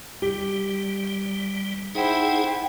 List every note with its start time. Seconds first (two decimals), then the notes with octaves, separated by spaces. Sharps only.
0.22 G3 G4
1.95 D#4 E4 G#4 C5 F#5 G5